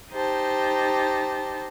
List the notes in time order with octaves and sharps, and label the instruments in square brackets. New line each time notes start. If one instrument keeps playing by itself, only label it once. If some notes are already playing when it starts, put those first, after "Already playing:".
[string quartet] D#4 G4 C5 A5